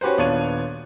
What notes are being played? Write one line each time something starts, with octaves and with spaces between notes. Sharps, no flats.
C#4 F#4 G4 B4 C5
D#1 B3 D4 F4 C#5 D#7